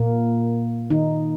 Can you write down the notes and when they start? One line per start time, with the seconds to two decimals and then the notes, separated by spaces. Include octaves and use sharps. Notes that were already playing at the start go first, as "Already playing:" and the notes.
Already playing: A#2 A#3
0.90 D#3 D#4